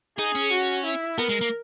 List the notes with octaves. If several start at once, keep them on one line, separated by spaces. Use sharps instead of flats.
D#4 G#4
C#4
F#4
E4
B3 A#4
G#3
A#3